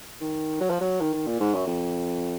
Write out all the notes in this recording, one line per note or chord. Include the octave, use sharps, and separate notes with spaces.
D#3
F#3
F3
F#3
D#3
D#3
A#2
G#2
F#2
F2